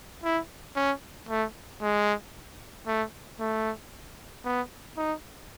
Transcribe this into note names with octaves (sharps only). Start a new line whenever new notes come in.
E4
C#4
A3
G#3
A3
A3
B3
D#4